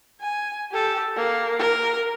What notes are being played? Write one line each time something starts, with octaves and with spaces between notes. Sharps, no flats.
G#5
G4 A4
A#3
A#4